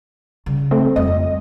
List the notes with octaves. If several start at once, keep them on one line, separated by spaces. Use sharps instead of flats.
C#3 G3
A3 C4
F2 G3 D#5